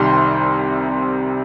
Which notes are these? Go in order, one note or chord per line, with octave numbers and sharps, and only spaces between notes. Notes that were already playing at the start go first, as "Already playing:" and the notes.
Already playing: C2 C3 D#3 G3 C6